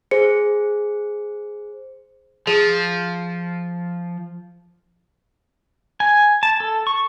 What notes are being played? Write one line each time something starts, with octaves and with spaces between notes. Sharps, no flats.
G#4 C5 C#7
F3 G#4
G#5
A5
A4
C#6